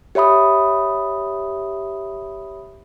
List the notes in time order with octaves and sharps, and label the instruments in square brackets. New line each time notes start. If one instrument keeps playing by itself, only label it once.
[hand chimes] G4 C#5 E5 B5 D#6